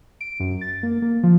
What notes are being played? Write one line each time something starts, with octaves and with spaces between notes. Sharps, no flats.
D7
F#2
A6
A#3
A#3
F3